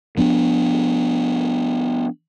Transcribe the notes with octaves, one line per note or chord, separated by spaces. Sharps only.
F3 B3 C4 D4